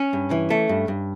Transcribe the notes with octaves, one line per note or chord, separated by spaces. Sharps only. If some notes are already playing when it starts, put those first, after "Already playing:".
Already playing: C#4
G2
E3
A3
G2
G2